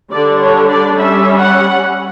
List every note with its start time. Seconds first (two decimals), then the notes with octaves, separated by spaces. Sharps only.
0.11 D3 G3 D4 D5
0.40 C#5
0.69 D5
0.96 G3 C#4 E5
1.40 F#5